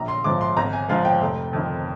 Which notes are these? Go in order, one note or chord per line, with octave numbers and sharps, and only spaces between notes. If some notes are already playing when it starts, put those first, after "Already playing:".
Already playing: A#1 A#5
C6
G#2 F3 D6
C6
G#1 A#5
G#5
G#2 F3 F5
G5
F1
F2 D#3